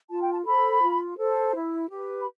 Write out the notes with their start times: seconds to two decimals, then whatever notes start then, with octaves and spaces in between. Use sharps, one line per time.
0.09 F4 A5
0.21 G5
0.32 A5
0.45 A4 C5 B5
0.82 F4
1.18 A4 C5
1.54 E4
1.90 G4 B4
2.21 B5